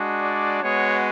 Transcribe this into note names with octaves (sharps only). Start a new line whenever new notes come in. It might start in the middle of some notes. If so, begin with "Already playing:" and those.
Already playing: G#3 D4 F#4
D5
G#3 B3 F#4 C#5